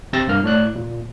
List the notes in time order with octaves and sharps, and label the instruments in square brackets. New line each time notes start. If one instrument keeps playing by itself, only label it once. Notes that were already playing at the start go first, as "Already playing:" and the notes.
[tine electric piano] C3 C4 E6 A6 A#6
G2 A#3 F6
A2 D5 F#6
A#2